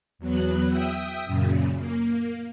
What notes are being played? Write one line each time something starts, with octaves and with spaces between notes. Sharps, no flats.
E2 F#3 B3 F#6
E5 G5 D#6 E6
F#2 A#2 C#3
A#3